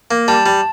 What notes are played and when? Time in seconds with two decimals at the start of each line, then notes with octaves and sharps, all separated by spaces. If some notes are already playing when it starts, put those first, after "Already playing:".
0.11 A#3
0.28 G3 A5
0.46 G3